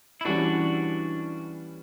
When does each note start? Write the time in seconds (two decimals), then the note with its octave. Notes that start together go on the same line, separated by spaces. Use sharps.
0.21 E4
0.25 E3 G3 C#4 D4 F#4